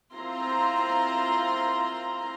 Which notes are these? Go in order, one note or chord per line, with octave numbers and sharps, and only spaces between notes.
C4 E4 F4 A#5 C6